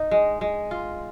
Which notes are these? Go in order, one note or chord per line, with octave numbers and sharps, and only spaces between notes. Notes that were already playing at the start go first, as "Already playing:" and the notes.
Already playing: D#4
G#3
G#3
F4